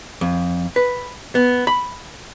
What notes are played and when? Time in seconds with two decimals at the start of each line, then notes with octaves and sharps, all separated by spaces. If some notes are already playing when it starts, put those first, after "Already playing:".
0.21 F2
0.76 B4
1.35 B3
1.67 B5